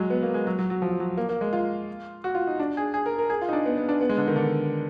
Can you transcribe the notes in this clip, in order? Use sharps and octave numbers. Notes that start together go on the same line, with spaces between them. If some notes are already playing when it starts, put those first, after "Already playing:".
Already playing: F#3 G#3
B3
A#3
G#3
F#3
F#3
F#3
F3
F#3
A#3
A#3
G#3
F4
F#4
F4
D#4
D4
G#4
G#4
A#4
A#4
G#4
F4
D#4
D4
B3
B3
D4
B3
G#3
D3
D#3
D3